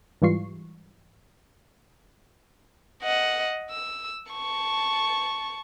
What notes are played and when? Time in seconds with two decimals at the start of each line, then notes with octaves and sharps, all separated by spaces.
0.22 G#2 E3 G3 F4 C#6 C7
3.03 D#5 F#5
3.71 E6
4.32 A5 C#6